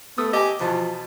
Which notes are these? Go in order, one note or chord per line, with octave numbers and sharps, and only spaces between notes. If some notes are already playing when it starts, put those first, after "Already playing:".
A3 B3 D#6 E6
G4 D#5 G#5
E2 B2 F3 A5